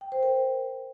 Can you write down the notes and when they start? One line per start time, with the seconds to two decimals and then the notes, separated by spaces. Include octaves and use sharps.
0.01 G5
0.12 C5
0.23 A#4